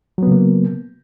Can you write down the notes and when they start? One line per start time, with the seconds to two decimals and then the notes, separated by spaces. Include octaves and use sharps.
0.18 F#3
0.23 B3
0.27 C#3
0.32 A#3